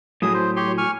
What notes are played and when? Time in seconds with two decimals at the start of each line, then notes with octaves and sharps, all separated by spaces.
0.22 A2 F#3 G#4 D#6
0.34 C5
0.56 G4 C#5 C6
0.78 G#5 C#6 F6